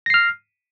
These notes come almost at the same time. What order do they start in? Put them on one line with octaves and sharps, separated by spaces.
A#6 C7 F6